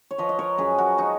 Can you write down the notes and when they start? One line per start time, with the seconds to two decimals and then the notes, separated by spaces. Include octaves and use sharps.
0.11 C#5
0.18 F3 B4 D#5
0.29 D#5
0.39 A#4 C#5
0.58 F#2 G#4 B4
0.78 F#4 A#4
0.98 D#4 F#4